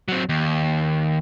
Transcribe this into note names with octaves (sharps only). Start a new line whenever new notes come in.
F#3 C4
D#2